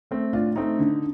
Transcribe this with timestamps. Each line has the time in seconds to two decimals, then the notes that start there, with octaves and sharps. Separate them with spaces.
0.11 A3 C4
0.33 A2 D4 F4
0.56 A3 C4 D#4
0.79 D3